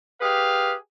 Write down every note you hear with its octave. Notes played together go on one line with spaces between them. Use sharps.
G4 G#4 B4 F5